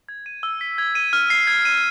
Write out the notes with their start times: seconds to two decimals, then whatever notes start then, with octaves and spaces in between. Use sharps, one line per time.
0.09 G#6
0.26 D#7
0.43 E6
0.61 B6
0.78 G#6
0.95 D#7
1.13 F6
1.30 C7
1.47 G#6
1.65 D#7